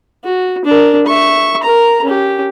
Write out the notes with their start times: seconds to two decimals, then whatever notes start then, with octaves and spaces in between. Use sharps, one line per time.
0.24 F#4
0.65 D4 A#4
1.06 E5 C#6
1.63 A#4 A#5
2.04 C#4 G4